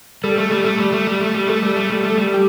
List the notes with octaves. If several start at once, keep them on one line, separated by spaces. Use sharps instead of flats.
G3 A4
A3
G3
A3
G3
A3
G3
A3
G3
A3 A4
G3
A3
G3 A4
A3
G3
G4